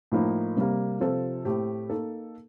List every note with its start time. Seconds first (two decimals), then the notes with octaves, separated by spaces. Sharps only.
0.12 A2 F3 A#3 D#4
0.57 C3 G3 A#3
1.00 C3 F3 C4 F4 A4
1.45 A2 A3 C4 G4
1.90 A#3 D#4 A4